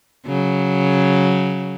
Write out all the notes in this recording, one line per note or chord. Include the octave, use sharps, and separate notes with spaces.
C#3 F#3